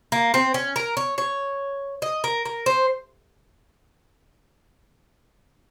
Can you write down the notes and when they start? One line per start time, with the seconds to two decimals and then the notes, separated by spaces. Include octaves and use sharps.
0.12 A#3
0.34 C4
0.54 C#4
0.76 A#4
0.97 C#5
1.18 C#5
2.02 D#5
2.24 A#4
2.45 A#4
2.66 C5